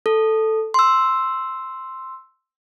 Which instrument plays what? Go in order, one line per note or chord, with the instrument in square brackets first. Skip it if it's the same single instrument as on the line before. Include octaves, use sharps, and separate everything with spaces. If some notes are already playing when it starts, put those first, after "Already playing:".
[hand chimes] A4
C6 E6